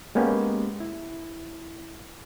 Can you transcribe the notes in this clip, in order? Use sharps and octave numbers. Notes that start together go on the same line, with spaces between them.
G#3 A#3 B3 C#4 G4
E4